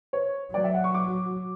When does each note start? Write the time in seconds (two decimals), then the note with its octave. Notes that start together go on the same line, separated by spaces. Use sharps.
0.13 C#5
0.53 F#3 D5
0.64 E5
0.74 F#5
0.84 C#6
0.94 D6